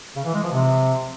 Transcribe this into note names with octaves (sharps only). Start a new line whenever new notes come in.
C#3
E3
G#3
F3
C3